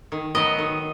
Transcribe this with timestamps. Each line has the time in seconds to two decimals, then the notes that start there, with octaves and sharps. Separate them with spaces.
0.12 D#3
0.35 F#3 B3 D#5
0.59 D#3